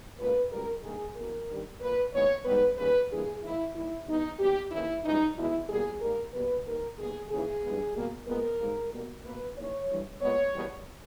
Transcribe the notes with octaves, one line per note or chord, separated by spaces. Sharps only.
C#2 B2 A#3 B4
C#2 B2 G3 A#4
G2 D#3 G3 A#3 G#4
E2 B2 A#3 A#4
G2 D#3 G3
A#2 A#3 B4
D#2 C#3 E3 G#3 B3 C#5
G#2 G3 B3 B4
D#2 C#3 G3 B4
G2 E3 A#3 G#4
G#2 D#3 A#3 E4
D#2 D#3 G3 E4
E2 B2 G3 B3 D#4
D#2 C#3 G3 B3 G4
D#2 C#3 E3 E4
C#2 C#3 E3 G3 D#4
E2 B2 G#3 E4
B2 G3 A#3 G#4
G#2 G3 A#3 A#4
B2 G3 A#3 B4
D#2 D#3 G3 A#3 A#4
D#2 D#3 G3 B3 G#4
D#2 C#3 E3 G#4
G2 E3 G#3 B3
B2 G3 A#3
A#2 G#3 B3 A#4
G#2 G3 A#3
B2 G3 A#3
B2 A#3 B4
D#2 C#3 E3 C#5
G2 E3 G3
A#2 G#3 B3 C#5
E2 B2 G3 A#3